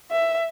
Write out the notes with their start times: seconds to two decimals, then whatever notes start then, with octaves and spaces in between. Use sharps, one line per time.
0.11 E5